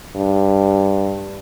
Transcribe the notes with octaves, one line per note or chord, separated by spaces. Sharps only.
G2